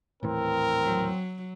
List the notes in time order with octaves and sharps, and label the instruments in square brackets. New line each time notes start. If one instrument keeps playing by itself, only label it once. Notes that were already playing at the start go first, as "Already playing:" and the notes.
[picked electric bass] D#1 A2 E3 [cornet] C4 [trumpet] A#4
[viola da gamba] F#3